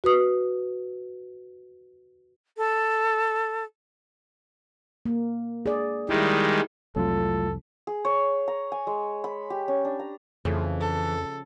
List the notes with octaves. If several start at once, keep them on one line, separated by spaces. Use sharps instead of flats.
F#4 B4 D#6
A4
A#3
G#4 D5
D#3 G3 G#3 E4
C2 F2 F#3 A3 F4 A4
G#4
C#5
A#5
G#5
G#3
B5
G4
C#4
D4
A#5
F2 C#3 E3 F3 A3
A4